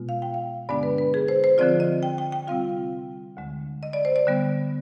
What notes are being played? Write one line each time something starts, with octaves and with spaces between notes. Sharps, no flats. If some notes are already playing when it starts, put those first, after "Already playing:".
Already playing: B2 G#3 B3 F4
F5
G5
F5
G2 D3 G#3 B3 D4 D5
B4
B4
G#4
C5
C5
D3 F3 C4 F4 D5
D#5
G5
G5
G5
C3 G3 C4 F4 F5
D2 D3 G#3
D#5
D5
C5
D5
D3 G3 B3